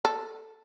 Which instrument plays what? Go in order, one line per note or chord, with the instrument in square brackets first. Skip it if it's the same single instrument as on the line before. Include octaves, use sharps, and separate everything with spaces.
[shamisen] A4